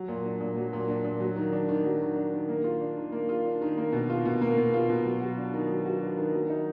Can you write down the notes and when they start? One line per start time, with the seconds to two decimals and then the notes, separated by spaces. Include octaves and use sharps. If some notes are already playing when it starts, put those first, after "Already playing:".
Already playing: F#3
0.08 A#2
0.25 D4
0.40 A#2
0.57 F#3
0.73 A#2
0.88 D4
1.04 A#2
1.20 F#3
1.36 D#3
1.53 D4
1.69 D#3
1.84 F#3
2.01 D#3
2.17 D4
2.33 D#3
2.49 A#3
2.64 F4
2.81 D4
2.97 D#3
3.12 A#3
3.29 F4
3.46 D4
3.62 D#3
3.78 A#3
3.93 B2
4.10 F4
4.25 B2
4.42 A#3
4.58 B2
4.74 F4
4.90 B2
5.05 F#3
5.21 F#4
5.38 D4
5.54 D#3
5.70 F#3
5.86 F#4
6.01 D4
6.17 D#3
6.34 F#3
6.50 D#4